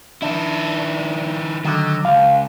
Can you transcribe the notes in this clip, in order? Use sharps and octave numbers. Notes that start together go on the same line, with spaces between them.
D#3 D4 E4
D3 D#3 F#3
C#2 F5